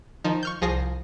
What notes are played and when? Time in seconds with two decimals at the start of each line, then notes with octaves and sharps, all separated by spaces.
0.24 D#3 F3 D#4
0.43 C#6 F6 G6
0.62 C2 F3 G#4 A#6 C7